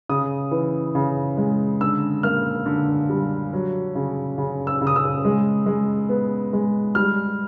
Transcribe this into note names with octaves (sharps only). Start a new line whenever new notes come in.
C#3 D#6
E3
C#3
G#3
D3 E6
A#3 F6
D3
G3
F#3
C#3
C#3
E6
C#3
D#6
E6
G#3
G#3
B3
G#3
G3 F6